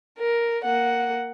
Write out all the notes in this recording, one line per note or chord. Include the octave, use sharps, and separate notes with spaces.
A#4
A#3 F#5